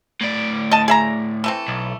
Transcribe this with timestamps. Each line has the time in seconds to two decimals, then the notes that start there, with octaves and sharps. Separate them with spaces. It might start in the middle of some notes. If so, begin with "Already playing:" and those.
0.21 A2 D5
0.71 D#5 A5
0.88 G#4 E5 A#5
1.44 E3 A3 C4
1.68 B1